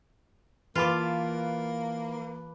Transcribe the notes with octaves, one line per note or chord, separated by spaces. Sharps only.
E3 A#3 F4 B4 A5 D6